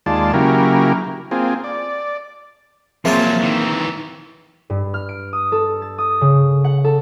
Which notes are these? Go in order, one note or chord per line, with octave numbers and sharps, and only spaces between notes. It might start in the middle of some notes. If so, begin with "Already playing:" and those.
D#2 G#3 F4 D5 A5
C#3 F#3 A#3 E4 G4 A#4
A#3 C4 F4 G#4
D5
F3 F#3 A#3 C4 F4 G#4 E5
D#3 E3
G2
F6
D7
D#6
A4
A6
D#6
C#3
F#5
A4